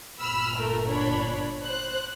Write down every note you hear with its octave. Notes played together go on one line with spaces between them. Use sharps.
G1 A#2 B5 E6 F6
A3 A#4
D4 C#5 B5
C5 F#6